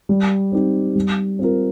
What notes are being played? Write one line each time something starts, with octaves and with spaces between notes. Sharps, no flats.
G3
C4 D#4 G4
G3
C4 F4 A#4